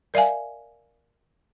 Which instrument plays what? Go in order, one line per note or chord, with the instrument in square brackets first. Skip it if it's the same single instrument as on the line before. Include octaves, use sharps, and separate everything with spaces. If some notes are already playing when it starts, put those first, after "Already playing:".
[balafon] A#4 D5 E5 F5 G#5